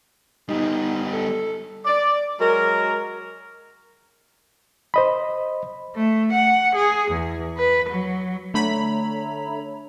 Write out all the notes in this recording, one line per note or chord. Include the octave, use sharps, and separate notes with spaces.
G3 B3 D#4
A4
D5
F#3 G#3 A#4
C5 D#5 B5
A3
F#5
G#4
E2
B4
F#3
D3 A3 D4 A4 C#5 A#5 B5